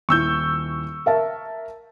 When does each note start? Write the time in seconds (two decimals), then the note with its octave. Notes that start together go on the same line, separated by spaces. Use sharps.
0.09 D#1 E4 C#6 E6 G6
1.06 A#4 E5 A5